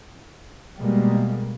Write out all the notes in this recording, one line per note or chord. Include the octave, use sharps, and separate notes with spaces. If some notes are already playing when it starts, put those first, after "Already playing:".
B2 G3 G#3 A#3